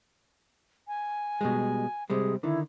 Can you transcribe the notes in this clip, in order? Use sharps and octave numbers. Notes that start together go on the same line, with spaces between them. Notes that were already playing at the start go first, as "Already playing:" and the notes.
G#5
B2 G3 G#3
C3 G3 G#3 G#4
D3 D#3 E4